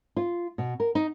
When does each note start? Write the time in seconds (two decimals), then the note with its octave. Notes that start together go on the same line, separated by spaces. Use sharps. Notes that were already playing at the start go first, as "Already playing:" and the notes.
0.17 F4
0.58 B2
0.80 A#4
0.95 D#4